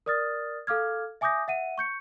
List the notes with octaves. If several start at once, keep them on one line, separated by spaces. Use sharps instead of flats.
A#4 D5 D#6 F6 A6
A4 F5 D6 F6 G#6
E5 G#5 D6 D#6 G6 A#6
E5 F#5 D#7
C#6 G6 C#7